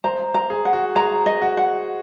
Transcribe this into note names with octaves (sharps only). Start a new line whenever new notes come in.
C5 A#5
A#5
G#4
F#5
F#4
G#4 A#5
D#5
F#4
F#5